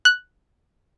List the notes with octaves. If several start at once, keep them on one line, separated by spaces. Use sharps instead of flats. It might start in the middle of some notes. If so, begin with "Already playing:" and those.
F#6